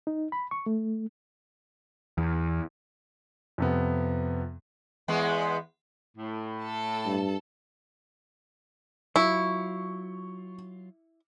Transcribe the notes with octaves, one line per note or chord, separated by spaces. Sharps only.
D#4
B5
C#6
A3
E2
F2 C3 B3
E2 G#3 B3
A2
A4 A5
G2
F#3 E4 F4 C#6